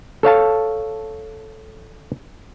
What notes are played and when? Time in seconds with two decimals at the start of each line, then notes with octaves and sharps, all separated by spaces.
0.23 A4 C#5 F5 A5